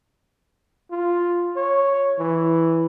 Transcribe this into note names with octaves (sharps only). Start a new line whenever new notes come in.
F4
C#5
E3